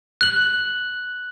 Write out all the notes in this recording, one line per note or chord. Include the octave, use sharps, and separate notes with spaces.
F#6 F#7